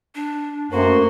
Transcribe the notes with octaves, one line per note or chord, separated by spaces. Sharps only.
D4
F#2 A3 A#3 F#4 A#4 C5 C6